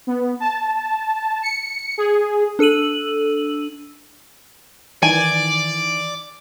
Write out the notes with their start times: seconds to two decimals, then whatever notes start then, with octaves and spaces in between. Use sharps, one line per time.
0.07 B3
0.40 A5
1.43 C#7
1.98 G#4
2.59 D4 A4 E6 D#7 F#7
5.03 D#3 E3 D5 G#5